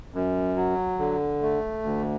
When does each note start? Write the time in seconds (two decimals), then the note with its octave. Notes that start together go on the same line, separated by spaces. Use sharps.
0.14 F#2
0.56 F#3
0.99 D3
1.42 A3
1.83 D2